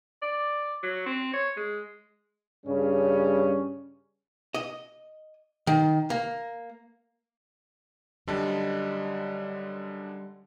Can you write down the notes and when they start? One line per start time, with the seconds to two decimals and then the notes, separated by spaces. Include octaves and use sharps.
0.22 D5
0.83 F#3
1.06 C4
1.34 C#5
1.57 G#3
2.66 G2 C#3 G3 C#4
4.54 D#5
5.67 D#3
6.10 A#3
8.28 F#2 D3 G3 D#5 A5